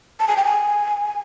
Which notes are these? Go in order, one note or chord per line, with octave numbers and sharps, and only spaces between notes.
A5
G#5
G5
G#5